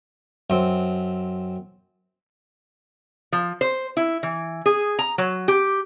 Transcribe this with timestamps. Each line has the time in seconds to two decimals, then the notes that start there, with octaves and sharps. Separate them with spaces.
0.50 F#2 C4
3.32 F3
3.61 C5
3.97 E4
4.23 E3
4.66 G#4
4.99 A#5
5.18 F#3
5.48 G4